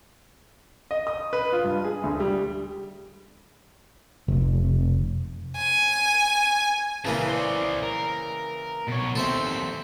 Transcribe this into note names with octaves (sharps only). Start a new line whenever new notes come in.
D#5
D#6
B4
F4
G2
G#4
D2
G3
F1
G#5
C#3 E3 A#3 B4 A5
C5 D5
A#4
B2 C#5
D#2 C4 A4 C5 E5